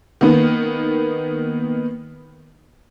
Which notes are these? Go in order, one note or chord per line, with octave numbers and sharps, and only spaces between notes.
D#3 A#3 B3